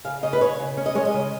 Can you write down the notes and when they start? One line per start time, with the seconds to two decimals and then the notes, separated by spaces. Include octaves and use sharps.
0.05 C#3 F5
0.23 C#3 D#5
0.33 B4
0.41 C#3 C#5
0.59 C#3
0.77 C#4
0.86 D#5
0.95 G#3 C#5
1.05 D#5
1.14 C#3